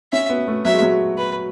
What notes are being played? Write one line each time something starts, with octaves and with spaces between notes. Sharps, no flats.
C#4 E5
B3
A3
F#3 E5
G#3
F#3
B4